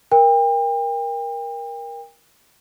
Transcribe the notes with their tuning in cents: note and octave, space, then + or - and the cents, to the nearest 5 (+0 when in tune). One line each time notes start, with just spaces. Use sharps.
A#4 +15 G5 +35